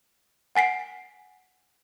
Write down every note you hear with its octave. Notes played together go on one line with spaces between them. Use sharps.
F#5 G#5 B6 C7 D7